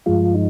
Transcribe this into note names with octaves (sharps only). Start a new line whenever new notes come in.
G2 F3 G#3 F4
D#4